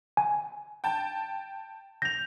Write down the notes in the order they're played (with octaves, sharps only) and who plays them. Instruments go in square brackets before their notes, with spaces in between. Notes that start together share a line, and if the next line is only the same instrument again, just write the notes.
[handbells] G#5
[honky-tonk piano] G5 A5
[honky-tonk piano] G6 F7 [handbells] A#6